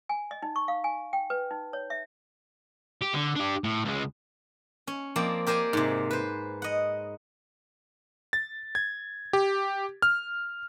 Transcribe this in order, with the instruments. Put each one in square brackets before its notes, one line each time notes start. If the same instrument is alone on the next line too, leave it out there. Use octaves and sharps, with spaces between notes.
[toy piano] G#5
D#5
D#4
C#6
F5
G#5
G5
B4
D#4
C#5
E5
[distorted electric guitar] G4
D3
D4 G4
A2
C#2 G#3
[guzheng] C#4
F3 A#3 C4 D5
G4 A#4 C5 D5 G#5
G#2 C3
B4 C5
D#5 F#5
[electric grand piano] A6
G#6
G4
F6